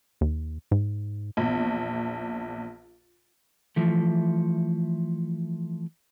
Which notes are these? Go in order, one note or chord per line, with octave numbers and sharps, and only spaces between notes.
D#2
G#2
A#1 E2
E3 F3 A3